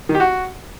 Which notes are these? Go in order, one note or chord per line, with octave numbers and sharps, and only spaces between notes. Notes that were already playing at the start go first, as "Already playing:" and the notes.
D#3
G4
F#4